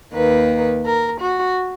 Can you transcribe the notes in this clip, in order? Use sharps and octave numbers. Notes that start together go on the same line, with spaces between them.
D#2 D#3 A#3 B4
A#4
F#4